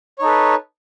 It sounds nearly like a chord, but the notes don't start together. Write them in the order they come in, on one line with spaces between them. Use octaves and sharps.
C#5 D#4 A4 B4